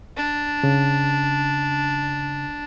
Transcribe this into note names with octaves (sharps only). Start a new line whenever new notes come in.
D4
C#3